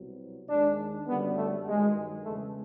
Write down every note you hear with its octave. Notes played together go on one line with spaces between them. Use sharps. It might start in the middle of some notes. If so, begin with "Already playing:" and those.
Already playing: C2 B2 F#3
D#2 D#3 G#3 D4
F#2 D3 G3 B3
A3
G2 D#3 F#3 G#3
E2 C#3 E3 G#3 A3